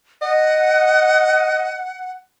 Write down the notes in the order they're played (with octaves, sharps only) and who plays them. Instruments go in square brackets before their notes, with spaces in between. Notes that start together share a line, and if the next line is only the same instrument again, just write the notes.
[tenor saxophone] D#5 [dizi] F#5